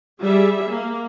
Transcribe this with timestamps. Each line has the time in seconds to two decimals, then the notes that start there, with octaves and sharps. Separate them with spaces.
0.21 G3 G#4 E5
0.68 A#3